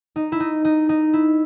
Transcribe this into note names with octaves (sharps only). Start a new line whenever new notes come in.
D#4
E4
D#4
D#4
D#4
E4